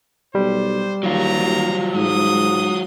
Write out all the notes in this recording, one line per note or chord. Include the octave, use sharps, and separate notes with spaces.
B1 G3 C5
D#2 F#3 F4 A#5
G#2 D#6